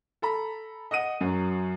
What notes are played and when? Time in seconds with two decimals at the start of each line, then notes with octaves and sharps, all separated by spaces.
0.22 A4 A#5 B5
0.91 D#5 F#5 D#6 D#7
1.21 F#2 F#3